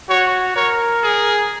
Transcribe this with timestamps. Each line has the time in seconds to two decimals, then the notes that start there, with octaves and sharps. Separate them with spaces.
0.09 F#4 C#5
0.56 A#4 C#5
1.03 G#4